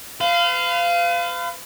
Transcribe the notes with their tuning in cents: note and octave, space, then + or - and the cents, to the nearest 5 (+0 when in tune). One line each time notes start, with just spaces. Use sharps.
B4 +40 F5 -10